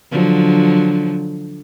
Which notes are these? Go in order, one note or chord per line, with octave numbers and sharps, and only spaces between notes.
D3 F3 F#3